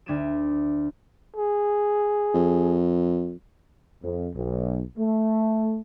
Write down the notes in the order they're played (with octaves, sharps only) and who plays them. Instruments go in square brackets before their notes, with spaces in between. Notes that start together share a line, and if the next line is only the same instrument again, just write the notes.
[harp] D2 D4 G#6 B6 D#7 E7
[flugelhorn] G#4
[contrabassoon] F2
[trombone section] F2
B1
A3